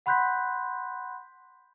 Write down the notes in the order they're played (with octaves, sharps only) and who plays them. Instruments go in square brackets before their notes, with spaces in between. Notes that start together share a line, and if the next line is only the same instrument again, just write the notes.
[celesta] F#5 B5 C6 F#6 G6 B6